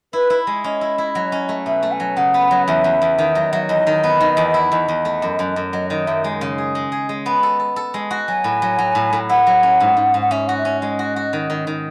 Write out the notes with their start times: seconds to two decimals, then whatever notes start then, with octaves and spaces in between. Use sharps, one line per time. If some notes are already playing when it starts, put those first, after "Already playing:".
0.13 E4 B4
0.30 E4
0.47 G#3
0.64 C#4 D#5
0.81 E4
0.98 E4
1.15 F#3
1.32 C#4
1.49 A3
1.66 B2 E5
1.83 A3
1.92 G#5
2.00 F#3
2.17 C#3 F#5
2.34 B3
2.51 F#3
2.67 E2 E5
2.84 E2
3.02 E2
3.18 D#3
3.35 F#3
3.53 F#3
3.69 E2 D#5
3.87 D#3
4.04 B3
4.20 D#3
4.37 E2
4.54 E4
4.71 E2 D#5
4.88 E2
5.05 A3
5.22 F#2
5.39 F#2
5.56 F#2
5.73 F#3 D#5
5.90 D#3 D#5
6.07 F#2 E5
6.24 G#3
6.41 C#3
6.58 G#4
6.75 G#3
6.92 G#4
7.09 G#3
7.26 B3
7.43 A4
7.60 A4
7.76 A4
7.94 G#3
8.11 F#4
8.28 F#3 G#5
8.44 A2
8.62 F#3
8.79 F#3
8.95 A2
9.13 A2
9.29 E4 F#5
9.47 F#3
9.63 C#4
9.80 G#2
9.97 G#2
10.14 G#2
10.21 F#5
10.31 C#4 E5
10.47 F#4 F#5
10.57 E5
10.65 C#4
10.82 G#3 D#5
10.99 F#4
11.16 F#4
11.33 D#3
11.50 D#3
11.67 D#3